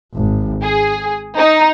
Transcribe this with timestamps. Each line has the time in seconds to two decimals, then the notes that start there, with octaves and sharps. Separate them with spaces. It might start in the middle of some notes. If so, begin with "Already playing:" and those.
0.14 G#1
0.64 G#4
1.38 D#4